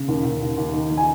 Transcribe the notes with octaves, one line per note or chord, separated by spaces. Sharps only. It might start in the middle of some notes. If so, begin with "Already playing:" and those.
Already playing: C#3
D#2
D#2
D#2
D#2
D#3
D#3
G#5